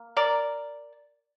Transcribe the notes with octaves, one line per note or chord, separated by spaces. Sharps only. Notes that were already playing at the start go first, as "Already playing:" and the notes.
Already playing: A#3
A#4 D5